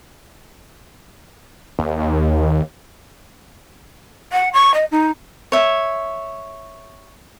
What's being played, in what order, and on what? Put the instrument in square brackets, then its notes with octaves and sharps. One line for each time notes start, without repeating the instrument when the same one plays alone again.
[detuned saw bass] D#2
[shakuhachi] F#5
C#6
D#5
D#4
[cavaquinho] C#5 E5